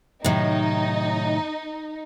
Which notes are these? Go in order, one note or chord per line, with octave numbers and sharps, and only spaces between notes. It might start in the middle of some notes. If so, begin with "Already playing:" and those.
A2 C3 D#3 F#3 D#4